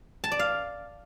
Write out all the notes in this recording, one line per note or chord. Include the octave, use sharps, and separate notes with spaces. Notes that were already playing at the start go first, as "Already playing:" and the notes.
A5
D5
F5